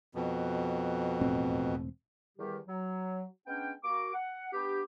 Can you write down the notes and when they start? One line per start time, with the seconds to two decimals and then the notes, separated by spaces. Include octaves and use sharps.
0.15 F2 B2
1.21 E1 A2 C4
2.38 E2 D#3 G3 G4
2.67 F#3
3.47 G#3 B3 C#4 D4 G5
3.84 A#3 F#4 D6
4.14 F#5
4.53 B3 D4 G4